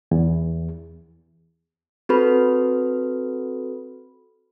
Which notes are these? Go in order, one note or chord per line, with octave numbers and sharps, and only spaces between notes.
E2
C4 F#4 A4 B4 B5